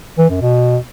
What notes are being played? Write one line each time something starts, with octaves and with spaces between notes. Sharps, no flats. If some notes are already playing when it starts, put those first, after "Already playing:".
E3
F#2
B2